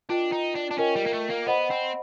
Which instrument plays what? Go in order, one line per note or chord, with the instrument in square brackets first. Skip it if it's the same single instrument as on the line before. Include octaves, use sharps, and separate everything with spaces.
[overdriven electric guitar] D4 [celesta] F4 A#4 D#5 G5
[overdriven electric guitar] D#4
D4
D4
[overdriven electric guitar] C#4 [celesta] F4 A#4 D#5 G5
[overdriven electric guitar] G3
A#3
A3
A#3
[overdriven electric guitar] B3 [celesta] C5 D#5 F#5 B5
[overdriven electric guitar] C4